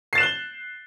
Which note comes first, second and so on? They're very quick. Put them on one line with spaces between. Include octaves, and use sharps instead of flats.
C7 A6 E7 F#6 G7